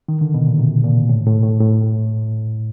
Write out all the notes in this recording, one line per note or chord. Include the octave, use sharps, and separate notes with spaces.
D#3
D3
B2
A#2
C3
A#2
A2
A2
A2
A2